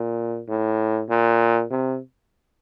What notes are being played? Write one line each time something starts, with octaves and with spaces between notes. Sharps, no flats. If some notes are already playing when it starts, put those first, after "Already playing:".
Already playing: A#2
A2
A#2
C3